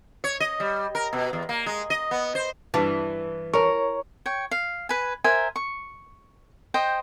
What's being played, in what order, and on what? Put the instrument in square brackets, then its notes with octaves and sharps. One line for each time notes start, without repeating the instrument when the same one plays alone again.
[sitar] C#5
D#5
G3
A#4
B2
E2
A#3
G#3
D#5
B3
C5
[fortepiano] G2 A5 [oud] E3
[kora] A#4 [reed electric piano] C#5 C#6
[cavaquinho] C#5 G5
F5
B4 G#5
A#4 C5 E5 G#5
C#6
C5 D#5 G5